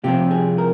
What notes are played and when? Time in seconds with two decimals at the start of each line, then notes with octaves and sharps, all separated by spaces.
0.04 C3 F3 C4 G4
0.31 G#4
0.58 A#4